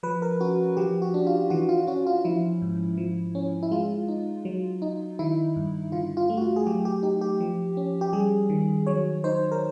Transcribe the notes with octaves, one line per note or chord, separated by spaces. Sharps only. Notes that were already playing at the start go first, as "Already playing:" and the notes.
F3 B4
A#4
C#4 F#4
F3 G4
F#4
D4
F4
E3 F#4
F4
C#4 F#4
F4
F3 E4
G#2
F3
C#4
E4
G#3 F4
D#4
F#3
D#4
D#3 E4
G2
D3 F4
F4
A3
F#4
F4
G#4
F#3 G4
G4
D#4 G4
G4
F3
C#4
G4
G3 G#4
D#3
F#3 C#5
D#4 C5
A#4